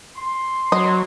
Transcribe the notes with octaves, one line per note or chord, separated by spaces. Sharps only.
C6
F#3 D#5